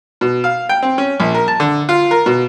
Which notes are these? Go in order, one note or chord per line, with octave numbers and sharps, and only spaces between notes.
B2
F5
G5
C4
C#4
A#1
A#4
A5
D3
F4
A#4
B2